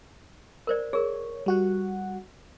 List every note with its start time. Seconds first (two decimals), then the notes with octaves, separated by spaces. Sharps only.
0.67 A#4 C5 D5
0.93 G#4 A#4 C#5
1.46 G3 F#4 F#5